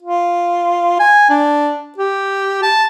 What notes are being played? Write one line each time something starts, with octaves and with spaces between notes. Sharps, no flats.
F4
G#5
D4
G4
A5